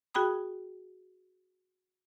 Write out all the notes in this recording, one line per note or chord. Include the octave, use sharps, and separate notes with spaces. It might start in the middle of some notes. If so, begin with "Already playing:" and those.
F#4 G#4 G5 B5 D#6